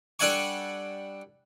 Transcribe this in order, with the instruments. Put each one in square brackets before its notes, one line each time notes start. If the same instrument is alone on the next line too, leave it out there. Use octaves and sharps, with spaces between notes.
[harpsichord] G3 D4 A4 F#5 G#5 C#6